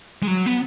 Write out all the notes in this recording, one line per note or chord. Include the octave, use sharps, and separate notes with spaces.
G#3
F#3
B3